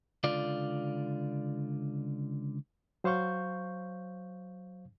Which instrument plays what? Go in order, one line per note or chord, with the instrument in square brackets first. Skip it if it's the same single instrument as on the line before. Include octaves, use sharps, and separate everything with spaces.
[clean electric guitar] C#2 D3 F4 D5
[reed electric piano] F#3 C5 F5 C#6 G6